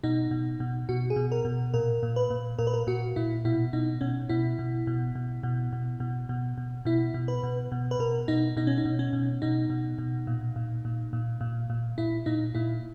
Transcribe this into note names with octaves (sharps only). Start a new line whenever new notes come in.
B2 D#4
B2
B2
B2 F#4
G#4
B2
A#4
B2
A#2 A#4
A#2
B4
A#2
A#2 A#4
B4
A#4
A#2 F#4
A#2 E4
B2 E4
B2 D#4
B2 C#4
B2 E4
B2
B2
B2
B2
B2
B2
B2
B2
B2 E4
B2
B4
B2
B2
B4
B2 A#4
B2 D#4
B2 D#4
C#4
D#4
B2
C#4
B2
B2 D#4
B2
B2
A#2
A#2
A#2
A#2
A#2
A#2
A#2 E4
A#2 D#4
A#2 E4